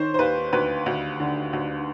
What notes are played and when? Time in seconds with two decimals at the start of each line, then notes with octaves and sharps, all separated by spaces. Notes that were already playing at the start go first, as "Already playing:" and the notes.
Already playing: D#3 C5 C#5
0.14 C5
0.19 D#2 B4
0.53 D2 B4
0.86 D2
1.20 D3
1.53 D2